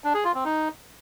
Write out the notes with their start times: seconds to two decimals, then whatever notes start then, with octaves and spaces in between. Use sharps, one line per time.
0.04 D4
0.14 G#4
0.25 F4
0.35 C4
0.45 D#4